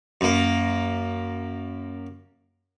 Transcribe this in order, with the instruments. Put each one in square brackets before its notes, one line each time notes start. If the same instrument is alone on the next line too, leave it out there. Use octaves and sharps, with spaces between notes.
[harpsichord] F#2 A#3